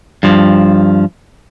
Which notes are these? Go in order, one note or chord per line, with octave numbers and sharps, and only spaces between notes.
G2 F3